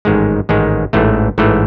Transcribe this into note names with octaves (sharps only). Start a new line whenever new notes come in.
A1 G#2 D#3 G#3
A1 G#2 D#3 G#3
A1 G#2 E3 A3
A1 G#2 E3 A3